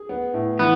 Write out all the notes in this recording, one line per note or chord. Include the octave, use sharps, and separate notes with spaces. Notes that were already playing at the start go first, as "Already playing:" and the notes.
Already playing: G#4
B3
A2
E3 B3